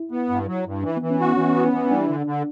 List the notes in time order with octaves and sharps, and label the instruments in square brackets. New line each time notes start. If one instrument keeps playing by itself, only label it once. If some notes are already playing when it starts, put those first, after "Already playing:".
Already playing: [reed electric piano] E4
[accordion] B3
G2
F#3
G2
[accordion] E3 [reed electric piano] D4
[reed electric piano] B3
[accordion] E3
[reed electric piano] C#4
[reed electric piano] B3 [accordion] F#4
[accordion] E3 [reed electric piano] C#4
[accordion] B3
E3
[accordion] G3 [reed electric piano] D4
[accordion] D3
D3